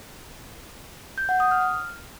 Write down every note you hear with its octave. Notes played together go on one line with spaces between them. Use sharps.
G6
F#5
D#6
F6